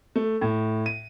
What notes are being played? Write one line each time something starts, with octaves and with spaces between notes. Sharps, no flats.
A3
A2
D#7